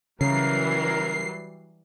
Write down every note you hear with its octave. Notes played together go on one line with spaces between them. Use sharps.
C#3 E3 F#3 G3 A#4 C7